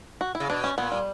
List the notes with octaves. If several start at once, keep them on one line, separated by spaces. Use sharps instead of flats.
F#4
E4
C#3
B2 D4
C#4
A#2 B3
G3